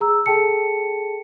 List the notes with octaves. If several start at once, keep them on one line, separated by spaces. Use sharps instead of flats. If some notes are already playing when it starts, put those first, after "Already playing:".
G#4 A#5 E6
G#4 A4 G5 A5 C#7